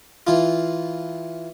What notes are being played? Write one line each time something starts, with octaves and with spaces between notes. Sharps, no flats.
E3 F4